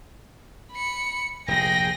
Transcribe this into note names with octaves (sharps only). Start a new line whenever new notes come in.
B5 C#7
F1 A#1 G#4 G5 A#6